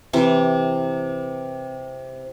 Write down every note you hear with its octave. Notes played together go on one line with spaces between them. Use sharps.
C3 E3 C4